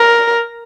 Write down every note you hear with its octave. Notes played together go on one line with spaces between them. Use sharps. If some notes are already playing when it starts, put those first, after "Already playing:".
Already playing: A#4